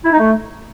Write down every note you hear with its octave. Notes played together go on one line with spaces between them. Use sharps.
E4
D#4
A3